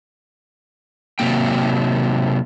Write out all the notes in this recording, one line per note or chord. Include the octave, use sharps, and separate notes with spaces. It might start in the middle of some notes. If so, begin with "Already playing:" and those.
C3 F#3 A#3 G5